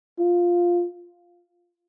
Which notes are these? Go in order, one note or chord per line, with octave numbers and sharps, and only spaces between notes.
F4